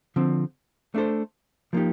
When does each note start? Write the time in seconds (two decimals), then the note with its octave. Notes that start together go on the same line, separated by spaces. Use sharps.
0.16 D3 F3 C4
0.94 A3 D4 A4 C5
1.73 F3 A#3 D#4 G4